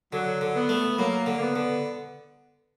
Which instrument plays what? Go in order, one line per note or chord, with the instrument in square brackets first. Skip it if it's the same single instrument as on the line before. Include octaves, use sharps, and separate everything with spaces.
[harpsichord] D3 [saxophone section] F#3
[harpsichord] D3
[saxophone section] B3
[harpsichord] A3
[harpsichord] F#3 [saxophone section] A#3
[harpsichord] D3
[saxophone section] A#3
B3
[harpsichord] D3